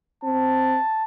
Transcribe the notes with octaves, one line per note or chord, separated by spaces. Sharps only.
C4 A5